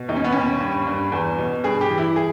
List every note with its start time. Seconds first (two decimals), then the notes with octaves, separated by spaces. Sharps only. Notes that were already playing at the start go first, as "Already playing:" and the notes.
Already playing: B2
0.08 D#2 D#4
0.16 C#4
0.24 B3
0.32 D#2 C#4
0.60 G2
0.87 G2
1.12 E2
1.38 B2
1.64 G2 G#4
1.81 G4
1.90 E3
1.98 E4
2.16 G#4